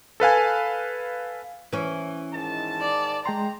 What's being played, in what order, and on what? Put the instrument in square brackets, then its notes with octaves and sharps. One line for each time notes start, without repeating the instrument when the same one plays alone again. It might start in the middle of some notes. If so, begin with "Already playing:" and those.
[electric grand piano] A4 B4 F5 G#5
[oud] E3 C#4
[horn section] G#2 D#3 A5
[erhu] D5
[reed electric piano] G#3 G5 C6 [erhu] A#5